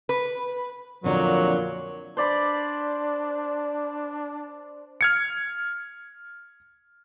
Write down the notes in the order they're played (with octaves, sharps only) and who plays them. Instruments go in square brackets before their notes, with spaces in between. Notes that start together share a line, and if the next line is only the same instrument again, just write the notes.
[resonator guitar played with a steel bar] B4
[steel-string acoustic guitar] F2 D3 A#4 [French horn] A#2 [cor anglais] F#3
[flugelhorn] D4 [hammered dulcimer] C5 D5 B5
[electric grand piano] F6 G#6 C#7